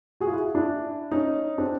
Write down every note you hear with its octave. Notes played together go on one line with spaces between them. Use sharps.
F#4 G#4
F4
E4 F#4
D4 E4
C#4 D#4
C4 D4